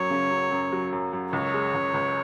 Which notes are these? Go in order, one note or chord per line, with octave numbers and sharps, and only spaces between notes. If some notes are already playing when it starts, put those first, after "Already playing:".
Already playing: F#2 F#3 C#5
C#3
F#2
F#2
F#3
F#2
F#2
C#2 C#5
G#3
C#2
C#2